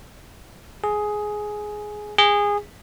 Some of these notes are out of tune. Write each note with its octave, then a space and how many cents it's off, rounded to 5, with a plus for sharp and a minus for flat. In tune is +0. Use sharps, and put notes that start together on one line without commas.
G#4 +10
G#4 -20